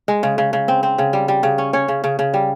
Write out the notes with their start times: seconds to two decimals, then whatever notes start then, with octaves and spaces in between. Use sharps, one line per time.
0.08 G#3
0.23 C#3
0.38 C#3
0.53 C#3
0.68 C4
0.83 C4
0.98 C#3
1.13 G3
1.28 G3
1.43 C#3
1.58 C#4
1.73 C#4 C#5
1.88 C#3
2.04 C#3
2.19 C#3
2.34 G3